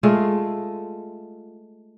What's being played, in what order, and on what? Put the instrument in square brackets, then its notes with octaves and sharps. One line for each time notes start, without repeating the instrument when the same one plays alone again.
[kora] G#3 A3 F4